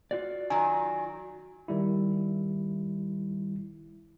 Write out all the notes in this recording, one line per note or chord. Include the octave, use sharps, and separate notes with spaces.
F4 F#4 D5
D#3 F#3 G#5
D#3 G3 E4